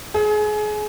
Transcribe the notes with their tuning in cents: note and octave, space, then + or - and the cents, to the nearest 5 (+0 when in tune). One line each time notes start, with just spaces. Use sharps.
G#4 +30